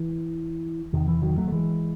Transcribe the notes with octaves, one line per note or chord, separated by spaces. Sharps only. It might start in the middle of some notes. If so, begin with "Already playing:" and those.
Already playing: E3
E2 C3 D#3
E3
D#3 F#3
F#3 A3
A3
E3 G#3